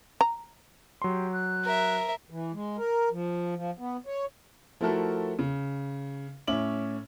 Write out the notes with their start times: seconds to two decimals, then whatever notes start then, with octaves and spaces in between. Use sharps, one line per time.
0.21 A#5
1.02 F#3 G4 C6
1.32 F#6
1.64 A#4 E5
2.30 E3
2.53 G#3
2.77 A#4
3.11 F3
3.56 F3
3.78 B3
4.06 C#5
4.81 F3 A3 E4 F#4 A4 A#4
5.39 C#3
6.48 A2 C#4 E5 D6 F#7